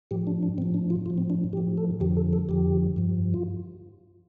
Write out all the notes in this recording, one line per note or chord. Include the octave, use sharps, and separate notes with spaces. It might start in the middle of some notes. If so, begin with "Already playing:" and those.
A2 F3 G4
D4
D4
A2 F3 C4
D4
F4
A2 F3 F4
C4
D4
A2 F3 G4
A4
F2 D3 F3 G4
A4
A4
F2 D3 F3 G4
G2 F3
F4